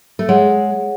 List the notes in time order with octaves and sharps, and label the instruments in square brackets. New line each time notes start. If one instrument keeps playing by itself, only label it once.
[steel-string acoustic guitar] A3
[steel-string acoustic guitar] G#3 [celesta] G#4 C#5 F#5